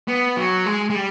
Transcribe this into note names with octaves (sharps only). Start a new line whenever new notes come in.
B3
F#3
G#3
G#3
G3